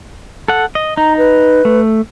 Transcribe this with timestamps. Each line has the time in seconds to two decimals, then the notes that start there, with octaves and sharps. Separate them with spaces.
0.48 A4 F#5
0.75 D#5
0.97 D#4 A#5
1.18 B4
1.65 A3